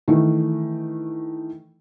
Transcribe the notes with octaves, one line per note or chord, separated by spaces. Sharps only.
D#3 E3 A3